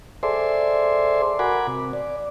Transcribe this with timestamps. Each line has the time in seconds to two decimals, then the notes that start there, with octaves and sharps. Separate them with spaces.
0.23 G#4 A4 C5 D5 E5 C6
1.39 F#4 A#4 F#5 G#5 B5 D6
1.67 C3
1.93 D5